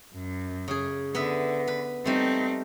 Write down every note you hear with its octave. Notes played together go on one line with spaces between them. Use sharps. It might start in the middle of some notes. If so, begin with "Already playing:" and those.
F#2
C#3 G#4
D3 B3 B4 E5
B4
G3 A3 C4 D#4